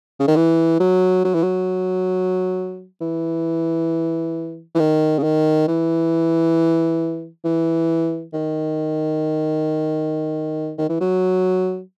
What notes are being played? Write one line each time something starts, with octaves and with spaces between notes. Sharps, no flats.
C#3
D#3
E3
F#3
F#3
E3
F#3
E3
E3
D#3
C#3
D#3
E3
E3
D#3
D#3
E3
F#3